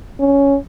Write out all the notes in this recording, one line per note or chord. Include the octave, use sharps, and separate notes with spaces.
C#4